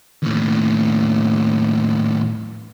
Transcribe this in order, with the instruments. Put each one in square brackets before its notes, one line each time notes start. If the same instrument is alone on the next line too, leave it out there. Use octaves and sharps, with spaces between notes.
[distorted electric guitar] D#2 A2